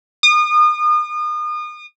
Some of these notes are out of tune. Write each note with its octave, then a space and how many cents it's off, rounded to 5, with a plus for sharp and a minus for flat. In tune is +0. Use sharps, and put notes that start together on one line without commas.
D#6 -35